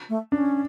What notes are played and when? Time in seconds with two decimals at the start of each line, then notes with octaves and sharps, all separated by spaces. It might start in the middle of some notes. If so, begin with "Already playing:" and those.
0.09 A3
0.32 C#4 D4